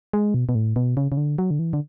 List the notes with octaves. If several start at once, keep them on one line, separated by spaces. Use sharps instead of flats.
G#3
B2
B2
A2
B2
C#3
C#3
D3
F#3
D3
E3
D3